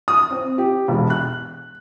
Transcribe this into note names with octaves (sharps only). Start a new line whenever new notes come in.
D#6
C4
G4
E1
F#6